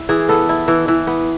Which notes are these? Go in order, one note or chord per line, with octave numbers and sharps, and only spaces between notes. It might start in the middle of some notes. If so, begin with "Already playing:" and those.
Already playing: E4
E3 G#4
B3 A4
E4
E3
E3
B3